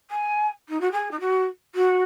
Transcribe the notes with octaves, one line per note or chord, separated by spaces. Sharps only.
G#5
D#4
F#4
G#4
D#4
F#4
F#4